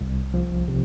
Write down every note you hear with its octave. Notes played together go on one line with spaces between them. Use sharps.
C2
F3
C3